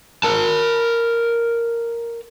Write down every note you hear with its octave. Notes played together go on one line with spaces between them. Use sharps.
A#4 A5